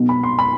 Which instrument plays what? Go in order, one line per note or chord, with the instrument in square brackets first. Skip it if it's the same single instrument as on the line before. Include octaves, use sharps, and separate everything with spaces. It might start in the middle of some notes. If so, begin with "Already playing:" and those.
Already playing: [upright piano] B1 B2
B5
C6
B5